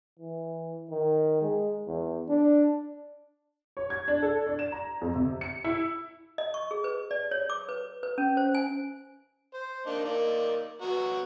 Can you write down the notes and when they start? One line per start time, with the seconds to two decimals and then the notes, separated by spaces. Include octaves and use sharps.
0.19 E3
0.90 D#3
1.42 G#3
1.87 E2
2.28 D4
3.77 C#5
3.90 G#6
4.08 D4
4.22 A4
4.47 D4
4.59 E7
4.72 A#5
5.01 F2
5.16 C3
5.41 C#7
5.64 E4
6.38 D#5
6.54 C#6
6.71 G#4
6.84 B4
7.11 D5
7.31 C#5
7.50 D6
7.69 B4
8.03 B4
8.18 C#4
8.37 C5
8.54 G#5
9.54 C5
9.86 A#3 D4 D#4
10.05 A#3 D#4 D5
10.82 B3 F#4 A#5